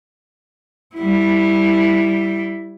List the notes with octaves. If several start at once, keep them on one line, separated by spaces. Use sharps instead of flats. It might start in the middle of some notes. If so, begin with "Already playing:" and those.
G3 E4